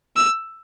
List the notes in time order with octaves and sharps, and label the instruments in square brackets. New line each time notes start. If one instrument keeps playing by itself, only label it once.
[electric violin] E6